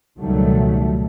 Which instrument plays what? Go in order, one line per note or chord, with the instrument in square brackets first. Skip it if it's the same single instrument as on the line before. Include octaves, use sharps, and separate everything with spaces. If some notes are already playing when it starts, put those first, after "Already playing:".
[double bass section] C#2 B2 D#3 F#3 G3 A3